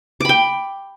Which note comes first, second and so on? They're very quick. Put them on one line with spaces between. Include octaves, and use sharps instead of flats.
D6 B5 G5